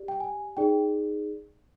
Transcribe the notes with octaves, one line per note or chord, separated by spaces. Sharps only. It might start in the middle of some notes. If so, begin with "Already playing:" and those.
Already playing: G4 D5
G5
G#5
D#4 G#4 D5 G5